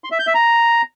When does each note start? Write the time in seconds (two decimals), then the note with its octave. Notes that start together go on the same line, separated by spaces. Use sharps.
0.04 C6
0.12 E5
0.19 G6
0.27 E5
0.34 A#5